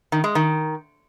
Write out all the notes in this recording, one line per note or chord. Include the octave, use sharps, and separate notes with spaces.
D#3
G#3
D#3